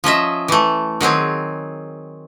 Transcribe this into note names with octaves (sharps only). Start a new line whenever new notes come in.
F3 C#4 D#5 E5
E3 A3
D#3 F#3 C4 G#4